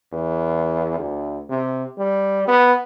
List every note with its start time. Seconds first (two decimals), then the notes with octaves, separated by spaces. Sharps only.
0.12 E2
0.99 D2
1.49 C3
1.98 G3
2.48 B3